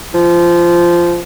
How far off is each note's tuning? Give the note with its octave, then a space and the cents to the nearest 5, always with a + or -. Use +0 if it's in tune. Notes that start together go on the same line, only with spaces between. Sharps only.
F3 -15